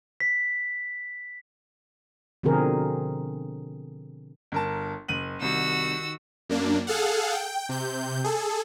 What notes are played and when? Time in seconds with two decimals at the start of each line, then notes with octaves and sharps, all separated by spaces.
0.20 B6
2.43 B2 D3 F3 C4 G#4 A#4
4.52 G1 A#4 A5
5.08 F#1 D#7 F#7
5.42 C2 D#3 F#4 E6
6.49 F#2 A#3 D4
6.87 G#4 A4 F5 F#5
7.32 G5
7.69 C3 G6
8.24 G#4 A4